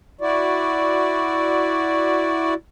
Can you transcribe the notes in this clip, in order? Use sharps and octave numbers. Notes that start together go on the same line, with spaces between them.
E4 F#4 D5